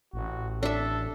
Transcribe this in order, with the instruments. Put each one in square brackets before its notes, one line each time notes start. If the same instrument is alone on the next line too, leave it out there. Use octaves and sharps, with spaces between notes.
[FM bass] A1 [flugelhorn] F#4
[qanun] D4 E5 [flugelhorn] A4